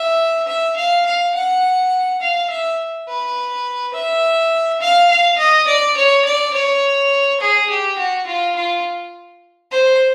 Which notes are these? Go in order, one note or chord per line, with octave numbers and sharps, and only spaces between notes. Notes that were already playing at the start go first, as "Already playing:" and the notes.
Already playing: E5
E5
F5
F5
F#5
F5
E5
B4
E5
F5
F5
D#5
D5
C#5
D5
C#5
G#4
G4
F#4
F4
F4
C5